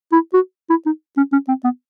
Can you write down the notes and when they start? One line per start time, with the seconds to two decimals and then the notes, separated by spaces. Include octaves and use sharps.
0.12 E4
0.33 F#4
0.70 E4
0.86 D#4
1.17 C#4
1.32 C#4
1.48 C4
1.64 B3